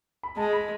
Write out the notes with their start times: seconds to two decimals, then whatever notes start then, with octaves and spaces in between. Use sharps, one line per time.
0.23 B5
0.37 G#3 A5
0.53 B5